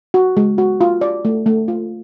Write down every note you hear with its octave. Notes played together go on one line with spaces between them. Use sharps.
F#4
G#3
F#4
F4
D5
A3
A3
F4